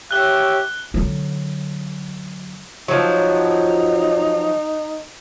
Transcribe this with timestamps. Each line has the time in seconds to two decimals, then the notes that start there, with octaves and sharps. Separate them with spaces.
0.11 G4 C#5 E5 F#6 G7
0.94 D3 F#3
2.88 F3 F#3 D#4